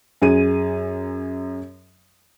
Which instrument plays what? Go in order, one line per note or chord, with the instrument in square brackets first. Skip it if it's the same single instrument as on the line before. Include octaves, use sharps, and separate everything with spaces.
[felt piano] F#2 G#4 D#7